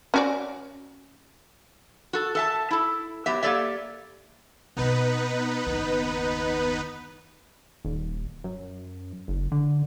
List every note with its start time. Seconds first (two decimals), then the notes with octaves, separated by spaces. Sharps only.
0.14 C#4 F#4 D5
2.13 F#4 A4
2.35 A4 E5 A5
2.71 E4 A4
3.26 F#3 B3 G4 E5
3.43 A#3 G4 A4 D5 E5
4.77 B2 B3 C4 D#4 B4
5.66 F#1 D#2
7.85 D#1
8.44 F#2
9.28 F#1
9.52 D3